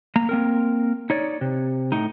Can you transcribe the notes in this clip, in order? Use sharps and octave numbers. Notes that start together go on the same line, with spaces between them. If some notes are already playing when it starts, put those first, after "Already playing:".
A#3 A#5
A#3 C4 A#4
D#4 C#5 D5
C3
A2 D#4